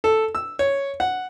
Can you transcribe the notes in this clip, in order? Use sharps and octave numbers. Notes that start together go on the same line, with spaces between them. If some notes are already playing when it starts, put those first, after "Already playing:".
A4
E6
C#5
F#5